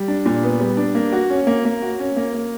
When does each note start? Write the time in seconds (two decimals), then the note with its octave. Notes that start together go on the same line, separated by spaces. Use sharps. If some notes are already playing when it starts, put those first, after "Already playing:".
Already playing: G3
0.08 D4
0.26 A#2
0.43 B3
0.60 G3
0.77 D4
0.95 A#3
1.13 F#4
1.30 C#4
1.47 A#3
1.65 A#3
1.82 F#4
2.00 C#4
2.16 A#3
2.34 A#3